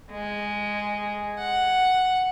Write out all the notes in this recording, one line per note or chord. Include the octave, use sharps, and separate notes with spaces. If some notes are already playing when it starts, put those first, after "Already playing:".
G#3
F#5